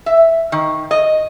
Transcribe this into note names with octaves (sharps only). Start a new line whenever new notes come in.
E5
D#3
D#5